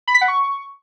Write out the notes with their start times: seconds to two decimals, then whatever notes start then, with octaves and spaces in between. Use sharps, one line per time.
0.08 B5
0.14 B6
0.21 F#5
0.28 C#6